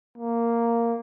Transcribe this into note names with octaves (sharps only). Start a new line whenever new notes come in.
A#3